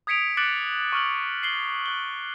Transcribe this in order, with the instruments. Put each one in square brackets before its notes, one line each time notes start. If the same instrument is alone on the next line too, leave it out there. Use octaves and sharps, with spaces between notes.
[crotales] D#6 G#6 B6 C#7 D7 F7
D6 F#6 A6 C#7 D7 F#7
C#6 F6 F#7
C7 F#7 G7
F#6 G7